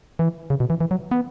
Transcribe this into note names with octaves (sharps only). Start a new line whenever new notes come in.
E3
C#3
B2
E3
E3
F#3
B3